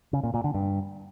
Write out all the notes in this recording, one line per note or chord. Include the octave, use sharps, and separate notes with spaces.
C#3
A#2
A#2
D3
G2